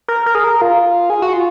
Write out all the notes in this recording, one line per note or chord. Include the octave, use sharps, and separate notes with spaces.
A#4
A#4
G#4
A#4
F4
G#4
F#4
F4